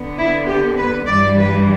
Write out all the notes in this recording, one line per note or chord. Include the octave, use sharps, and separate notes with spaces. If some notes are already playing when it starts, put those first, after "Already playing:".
Already playing: D3 B3
E4
G4
B4
G2 E3 G3 D5
B4